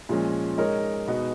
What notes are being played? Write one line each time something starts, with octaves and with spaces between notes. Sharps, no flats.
A#2 F3 G#3 C#4
G#3 D#4 A#4 C#5
B2 G#3 B3 D#4